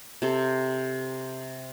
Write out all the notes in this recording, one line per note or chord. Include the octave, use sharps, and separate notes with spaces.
C3 A4